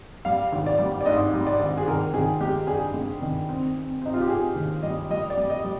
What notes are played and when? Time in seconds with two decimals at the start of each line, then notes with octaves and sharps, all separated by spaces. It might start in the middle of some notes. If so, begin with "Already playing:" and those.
0.25 G3 F5
0.52 G#1
0.66 D5
0.79 G3
1.01 D5
1.06 G#2 D#5
1.34 G3
1.47 D5
1.60 G#1
1.78 G#4
1.88 D#3 A#4
2.14 D#3 G#4
2.41 G#3 G4
2.67 G2 G#4
2.94 G#3
3.22 D#3
3.49 C4
3.76 C4
4.02 C4 D#4
4.14 F4
4.21 G4
4.29 C4 G#4
4.56 D#2
4.83 G3 D#5
5.10 G3 D#5
5.30 D5
5.37 G3
5.50 D#5
5.64 G3